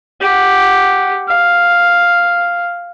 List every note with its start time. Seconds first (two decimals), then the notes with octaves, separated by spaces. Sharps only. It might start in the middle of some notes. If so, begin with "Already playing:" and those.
0.21 G4 F#5
1.28 F5